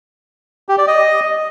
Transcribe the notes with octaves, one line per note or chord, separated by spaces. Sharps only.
G4
D5
D#5